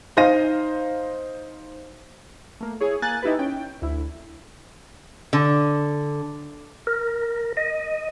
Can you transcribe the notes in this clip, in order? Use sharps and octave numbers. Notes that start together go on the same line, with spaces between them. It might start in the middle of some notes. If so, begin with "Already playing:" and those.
D#4 C5 F5 A#6 D#7
A3 A#3
E4 G#4 C#5
A#3 G#5 F#6 A6
D#4 E4 G4 B4
C#4 G5
D2 E4
D3
A#4
D#5